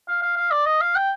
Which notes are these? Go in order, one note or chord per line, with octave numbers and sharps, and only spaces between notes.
F5
F5
F5
D5
D#5
F5
G5